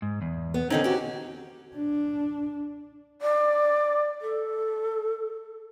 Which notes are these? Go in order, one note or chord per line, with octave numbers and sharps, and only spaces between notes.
G#2
E2
B3
D3 D#3 C4 C#4 D#4
F#4 G4
D4
D5
A4